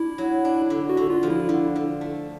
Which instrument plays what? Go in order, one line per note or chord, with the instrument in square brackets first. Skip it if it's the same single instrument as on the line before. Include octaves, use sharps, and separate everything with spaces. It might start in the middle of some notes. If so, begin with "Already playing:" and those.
Already playing: [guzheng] D4 [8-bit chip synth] E4
[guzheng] F#3
D4
D3
[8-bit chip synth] F#4
[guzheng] D3
[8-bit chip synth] F4
[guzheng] F3
[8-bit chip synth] E4
[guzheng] D3
D3
A3